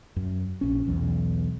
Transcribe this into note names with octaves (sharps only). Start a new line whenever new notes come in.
F#2
A#1 C#4
B1 E2